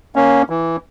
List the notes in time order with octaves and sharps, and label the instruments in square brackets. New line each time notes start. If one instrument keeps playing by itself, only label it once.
[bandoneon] A#3 C#4
E3